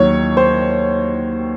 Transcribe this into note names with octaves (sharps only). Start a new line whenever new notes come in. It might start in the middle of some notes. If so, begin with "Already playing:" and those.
Already playing: D#2 D#3 F#3 C#5
C5